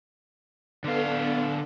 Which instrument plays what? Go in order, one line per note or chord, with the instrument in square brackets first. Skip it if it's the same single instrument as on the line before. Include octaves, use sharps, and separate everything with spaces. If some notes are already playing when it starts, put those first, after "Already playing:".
[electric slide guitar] D3 F5 [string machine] B3 D4 A4